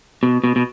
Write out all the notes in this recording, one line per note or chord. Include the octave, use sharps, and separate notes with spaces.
B2
B2
B2